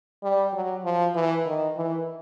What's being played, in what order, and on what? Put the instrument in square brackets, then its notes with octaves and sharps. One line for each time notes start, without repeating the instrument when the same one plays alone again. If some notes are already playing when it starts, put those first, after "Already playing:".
[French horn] G3
F#3
F3
E3
D#3
E3